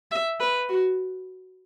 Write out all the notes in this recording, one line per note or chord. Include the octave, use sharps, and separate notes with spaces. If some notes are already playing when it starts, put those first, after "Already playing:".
E5
B4
F#4